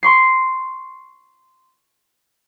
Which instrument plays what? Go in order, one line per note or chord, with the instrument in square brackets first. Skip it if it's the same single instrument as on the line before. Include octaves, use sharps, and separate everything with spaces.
[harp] C6 C#6 C7